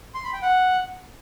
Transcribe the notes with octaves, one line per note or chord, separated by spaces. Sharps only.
C6
B5
G5
F#5